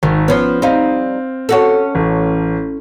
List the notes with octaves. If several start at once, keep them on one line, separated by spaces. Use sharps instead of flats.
G#1 D#3
F3 B3 C#4 C5
G3 C4 D#4 F5
C#4 F#4 A4
A1